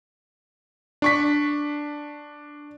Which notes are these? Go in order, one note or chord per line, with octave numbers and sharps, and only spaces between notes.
D4 C#6 B6